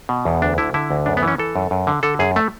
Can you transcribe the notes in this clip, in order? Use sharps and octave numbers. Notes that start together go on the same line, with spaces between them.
B2
E2
D2 D4
D3 E4
D3 E4
D2
F#2 D4
B3
E3 C#4
E3 A4
F#2
F#2
D3
D3 A4
F#2 G#4
A3